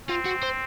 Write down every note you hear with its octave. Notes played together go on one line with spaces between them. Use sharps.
C4 F4
F#4
C5